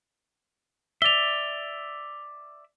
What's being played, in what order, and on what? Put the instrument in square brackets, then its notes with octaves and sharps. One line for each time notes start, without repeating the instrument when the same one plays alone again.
[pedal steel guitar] D5 E5 [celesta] F7 G7